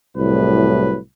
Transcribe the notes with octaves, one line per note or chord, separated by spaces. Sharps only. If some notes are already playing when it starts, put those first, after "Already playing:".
C2 A2 F#3 B4